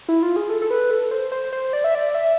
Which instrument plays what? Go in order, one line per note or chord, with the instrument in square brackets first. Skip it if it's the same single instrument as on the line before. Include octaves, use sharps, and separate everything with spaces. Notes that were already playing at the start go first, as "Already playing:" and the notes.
[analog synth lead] E4
F4
G#4
A4
A4
B4
A4
C5
C5
C5
D5
E5
D5
E5